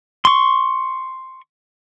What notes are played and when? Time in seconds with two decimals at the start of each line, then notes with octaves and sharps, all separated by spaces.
0.25 C6 C#6